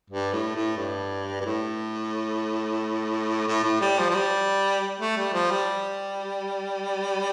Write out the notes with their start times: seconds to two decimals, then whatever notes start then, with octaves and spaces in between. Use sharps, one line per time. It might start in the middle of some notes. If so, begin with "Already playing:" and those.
0.10 G2
0.33 A2
0.56 A2
0.77 G2
1.41 G2
1.45 A2
3.48 A2
3.64 A2
3.81 G3
3.99 F3
4.10 F3
4.15 G3
5.00 A3
5.17 G3
5.34 F3
5.51 G3